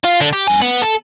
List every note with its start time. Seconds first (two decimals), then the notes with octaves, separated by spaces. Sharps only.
0.05 F4
0.21 D3
0.33 G4
0.47 G2 G#5
0.61 B3
0.82 A4